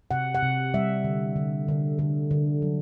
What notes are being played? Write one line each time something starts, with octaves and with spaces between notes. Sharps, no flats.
C3 F#5
F#5
C3
G3 E5
D3
D3
D3
D3
D3
F#3